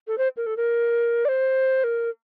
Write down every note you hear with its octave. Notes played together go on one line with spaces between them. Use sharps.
A4
C5
A#4
A4
A#4
D5
C5
A#4